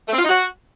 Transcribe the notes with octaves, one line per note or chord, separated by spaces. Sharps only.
A3
C4
F4
D#4
F#4